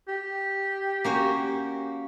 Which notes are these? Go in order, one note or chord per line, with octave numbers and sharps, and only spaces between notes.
G4
A#3 C#4 F#4